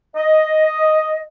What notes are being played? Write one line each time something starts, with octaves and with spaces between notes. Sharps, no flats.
D#5